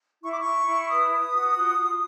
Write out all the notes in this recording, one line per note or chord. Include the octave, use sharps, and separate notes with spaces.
E4 C#6
D6
E4 C#6
E4
B4 D#6
B4
F#4
F4
F4